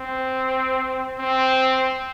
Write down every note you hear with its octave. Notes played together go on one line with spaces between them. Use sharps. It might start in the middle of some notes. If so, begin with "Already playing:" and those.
Already playing: C4
C4